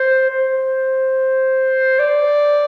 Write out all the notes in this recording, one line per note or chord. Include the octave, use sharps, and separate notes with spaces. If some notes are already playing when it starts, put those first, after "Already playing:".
Already playing: C5
C5
D5